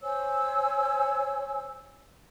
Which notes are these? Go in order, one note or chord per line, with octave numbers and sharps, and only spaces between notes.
C5 C#5 G#5 E6